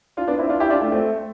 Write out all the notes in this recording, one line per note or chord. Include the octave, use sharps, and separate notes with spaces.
D4 F4
B3 D4
C4 E4
D4 F4
E4 G4
D4 F4
A3
A3 C4